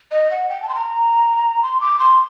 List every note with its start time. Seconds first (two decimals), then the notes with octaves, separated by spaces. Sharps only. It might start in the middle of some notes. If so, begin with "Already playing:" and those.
0.11 D#5
0.31 F#5
0.49 G5
0.62 A5
0.69 C6
0.75 A#5
1.63 C6
1.81 D6
1.99 C6